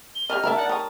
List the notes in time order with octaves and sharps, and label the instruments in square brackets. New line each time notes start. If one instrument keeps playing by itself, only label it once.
[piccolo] G7
[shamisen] G4 C5 D5 [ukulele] D#5 [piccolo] F6
[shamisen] B3 E4 E5 [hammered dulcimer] A#4 A5
[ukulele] D#4 D5 [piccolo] F#5
[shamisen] G4 C#5 [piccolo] D#6